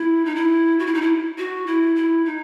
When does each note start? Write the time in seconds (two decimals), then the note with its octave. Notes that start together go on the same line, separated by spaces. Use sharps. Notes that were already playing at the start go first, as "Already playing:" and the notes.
Already playing: E4
0.25 D#4
0.35 E4
0.79 F#4
0.87 E4
0.94 D#4
1.01 E4
1.38 F#4
1.67 E4
1.96 E4
2.25 D#4